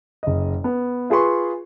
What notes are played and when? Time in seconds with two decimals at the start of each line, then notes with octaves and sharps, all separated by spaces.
0.23 F#1 D#5
0.64 B3
1.10 F4 G#4 B4 C6 C#6